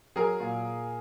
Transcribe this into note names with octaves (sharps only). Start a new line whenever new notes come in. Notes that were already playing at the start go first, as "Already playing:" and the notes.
F#3 G#4 A#4
A#2